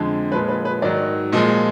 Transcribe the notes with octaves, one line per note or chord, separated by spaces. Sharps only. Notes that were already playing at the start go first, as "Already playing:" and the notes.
Already playing: F2 D3 G#3
A#2 F3 G#3 B4
B4
B4
G#2 D#3 F#3 D5
A#2 F3 G#3 D#5